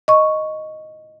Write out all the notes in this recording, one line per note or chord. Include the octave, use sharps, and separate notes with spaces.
D#5 C#6